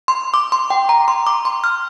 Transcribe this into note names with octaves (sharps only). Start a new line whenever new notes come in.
C6
D6
C6
G5
A#5
C6
D6
C6
F6